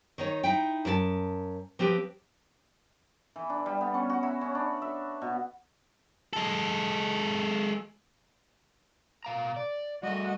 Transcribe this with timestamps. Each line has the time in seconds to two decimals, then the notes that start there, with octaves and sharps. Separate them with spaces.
0.18 D#3 D#4 C#5
0.43 D#4 E4 G5
0.85 F#2 A#4 A5
1.79 F3 C4 G4 B4
3.36 E3
3.50 D4
3.66 G3
3.81 B3
3.94 C#4
4.10 F#4
4.23 E4
4.41 C#4
4.55 D4
4.82 E5
5.22 B2
6.33 G#3 A4
9.25 B2 F5 A#5
9.56 D5
10.03 G3 A3 F#4 D#5